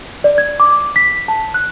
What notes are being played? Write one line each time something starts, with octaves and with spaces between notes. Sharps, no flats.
D5
G#6
D6
B6
A5
F#6